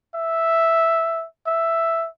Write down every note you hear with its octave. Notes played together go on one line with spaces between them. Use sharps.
E5
E5